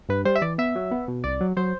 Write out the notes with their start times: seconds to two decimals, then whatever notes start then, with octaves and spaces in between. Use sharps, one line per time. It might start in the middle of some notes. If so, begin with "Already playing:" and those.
0.09 G2 B4
0.25 G3 C5
0.35 E5
0.41 E3 D5
0.58 B3 E5
0.75 F#3
0.91 B3
1.08 B2
1.24 C2 D5
1.40 F#3
1.57 F#3 C5